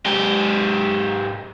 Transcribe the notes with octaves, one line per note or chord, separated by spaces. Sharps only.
G#2 G4